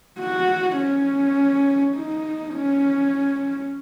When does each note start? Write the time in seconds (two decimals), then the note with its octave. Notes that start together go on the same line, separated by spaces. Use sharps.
0.19 F#4
0.78 C#4
1.96 D#4
2.55 C#4